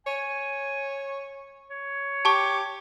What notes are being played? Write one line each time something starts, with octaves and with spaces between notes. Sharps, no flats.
C#5 G#5
C#5
G4 A5 C#6